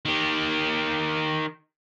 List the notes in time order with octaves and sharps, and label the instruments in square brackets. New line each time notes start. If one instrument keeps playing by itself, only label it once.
[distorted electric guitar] D#3 G4